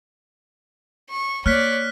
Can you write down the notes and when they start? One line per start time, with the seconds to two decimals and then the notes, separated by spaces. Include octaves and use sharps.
1.10 C#6
1.46 A#3 C#5 D5 F6 F#6 B6